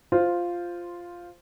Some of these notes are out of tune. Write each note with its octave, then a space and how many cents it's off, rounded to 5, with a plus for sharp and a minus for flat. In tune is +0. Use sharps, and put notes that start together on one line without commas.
F4 +0 C5 -5